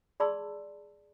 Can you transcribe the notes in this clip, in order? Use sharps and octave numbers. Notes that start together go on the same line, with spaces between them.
G#4 D5 A5 B5 C6 E6